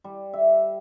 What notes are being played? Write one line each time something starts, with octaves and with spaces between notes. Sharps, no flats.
G3
E5